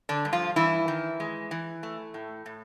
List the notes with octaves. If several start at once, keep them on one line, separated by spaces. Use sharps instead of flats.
D3 D4
G2
F3 F4
G2 E3 E4
D#3
G#3
E3
A3
A2
A2